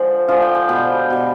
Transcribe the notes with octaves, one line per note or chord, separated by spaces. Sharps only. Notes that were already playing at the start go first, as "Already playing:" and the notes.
Already playing: D3 F3 G#3 C5 D5
D3 F3 G#3 F5
G5
G5
B2 G3 G5
B2 G3